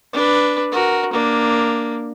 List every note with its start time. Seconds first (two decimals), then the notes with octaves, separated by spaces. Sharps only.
0.13 D4 B4
0.72 F#4 A#4
1.13 A#3 D4